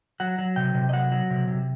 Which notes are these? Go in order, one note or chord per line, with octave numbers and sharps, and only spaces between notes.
F#3 F#5
F#3
C3 G5
C3
D#5
F#3 F#5
F#3
C3
C3